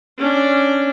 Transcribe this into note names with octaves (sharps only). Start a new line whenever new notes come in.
C#4 D4